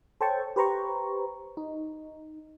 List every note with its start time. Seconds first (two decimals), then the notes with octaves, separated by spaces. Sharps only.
0.21 A4 C5 C#5 G5 A5 C#6
0.56 G4 B4 C5 A#5 C#6
1.57 D#4